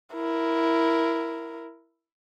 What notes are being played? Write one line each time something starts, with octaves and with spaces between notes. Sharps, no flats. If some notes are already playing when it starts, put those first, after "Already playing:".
E4 A#4